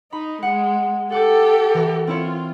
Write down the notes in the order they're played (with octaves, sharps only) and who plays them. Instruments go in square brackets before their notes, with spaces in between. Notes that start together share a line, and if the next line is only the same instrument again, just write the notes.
[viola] D#4 [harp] B5
[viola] G#3 [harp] F#5
[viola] G4 A4 [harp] F#5 D6 G6
[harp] E3 A#4 F6
[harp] C4 E4 C#5 [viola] F4